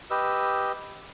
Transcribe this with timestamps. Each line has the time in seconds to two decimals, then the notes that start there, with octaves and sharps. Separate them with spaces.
0.10 G4 B4 D#5 E6